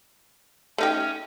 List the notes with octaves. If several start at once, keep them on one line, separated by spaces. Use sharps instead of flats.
A3 C#4 D#4 G4